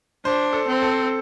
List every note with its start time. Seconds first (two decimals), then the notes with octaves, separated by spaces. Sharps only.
0.25 D4 C5
0.53 A4
0.67 C4
0.82 A4